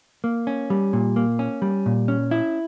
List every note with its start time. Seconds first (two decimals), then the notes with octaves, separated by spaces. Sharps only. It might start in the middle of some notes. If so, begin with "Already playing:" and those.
0.24 A#3
0.47 C#4
0.70 G3
0.93 A#2
1.16 A#3
1.39 C#4
1.62 G3
1.86 A#2
2.08 C#4
2.31 E4